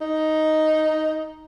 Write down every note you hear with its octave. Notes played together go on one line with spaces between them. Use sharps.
D#4